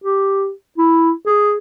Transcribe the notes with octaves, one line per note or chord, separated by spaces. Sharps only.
G4
E4
G#4